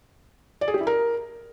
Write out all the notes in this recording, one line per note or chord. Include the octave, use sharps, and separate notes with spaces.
D5
G#4
G4
E4
A#4